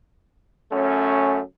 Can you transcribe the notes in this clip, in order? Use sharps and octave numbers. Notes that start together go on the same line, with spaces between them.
F#2 A3 C#4